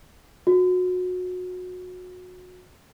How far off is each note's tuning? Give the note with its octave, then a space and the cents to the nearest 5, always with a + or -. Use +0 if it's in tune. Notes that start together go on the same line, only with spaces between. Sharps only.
F#4 -25